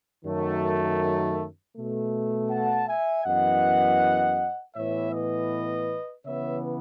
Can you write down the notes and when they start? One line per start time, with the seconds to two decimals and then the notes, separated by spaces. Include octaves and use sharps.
0.24 F#2 D#3 F#3 A3
1.76 B2 A3
2.50 F#5 A5
2.87 E5 G#5
3.25 F#2 E3 B3 D#5 F#5
4.75 A2 E3 B3 C#5 E5
5.13 B4 D#5
6.25 C#3 E3 B3 C#5 E5